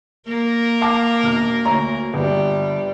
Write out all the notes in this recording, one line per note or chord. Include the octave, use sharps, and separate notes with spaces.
A#3 A#4
F5 A5 D6
E1 F6
D2 C#5 A#5
G1 G3